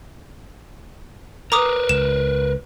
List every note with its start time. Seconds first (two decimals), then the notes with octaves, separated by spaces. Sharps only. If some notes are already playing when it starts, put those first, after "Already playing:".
1.52 A#4 B4 A#5 D6 D#6
1.89 C#2 E7